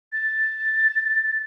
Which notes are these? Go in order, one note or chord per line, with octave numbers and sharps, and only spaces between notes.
A6